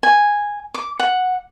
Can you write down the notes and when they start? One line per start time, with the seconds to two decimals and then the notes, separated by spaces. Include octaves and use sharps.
0.03 G#5
0.74 D6
0.99 F#5